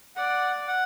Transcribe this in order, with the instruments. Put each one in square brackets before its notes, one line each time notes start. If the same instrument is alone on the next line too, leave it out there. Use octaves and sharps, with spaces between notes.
[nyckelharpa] D5 [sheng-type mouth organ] F#5
[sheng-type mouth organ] F#5